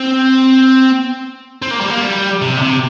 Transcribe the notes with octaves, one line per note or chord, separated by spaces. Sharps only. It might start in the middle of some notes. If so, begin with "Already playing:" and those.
Already playing: C4
C4
A#3
G3
A#3
G3
C3
D3
C3